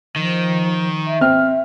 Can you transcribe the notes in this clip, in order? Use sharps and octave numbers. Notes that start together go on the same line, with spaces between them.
D#3 F3
E5
C4 F6